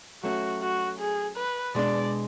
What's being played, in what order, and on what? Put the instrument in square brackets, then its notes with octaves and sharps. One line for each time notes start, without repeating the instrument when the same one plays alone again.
[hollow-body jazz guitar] F#3 A3 C#4 [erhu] F#4
[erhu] F#4
G#4
B4
[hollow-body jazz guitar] B2 G#3 D4 [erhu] D5